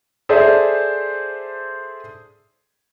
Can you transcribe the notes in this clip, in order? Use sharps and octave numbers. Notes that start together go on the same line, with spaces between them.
G#4 A4 C5 D5 E5